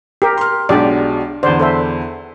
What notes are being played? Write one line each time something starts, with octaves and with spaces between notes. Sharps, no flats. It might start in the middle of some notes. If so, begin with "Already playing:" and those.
G4 A#4
C6 F6
B1 F#3 G#3 D4 G4 D5
E2 D3 C5 D5
A4 C5 E5